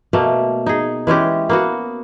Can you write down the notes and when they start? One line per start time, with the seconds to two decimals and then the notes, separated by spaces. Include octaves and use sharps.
0.13 B2 A3 A#3
0.66 D#4 G#4
1.07 E3 G#3 C#4 G4
1.49 A#3 B3 F#4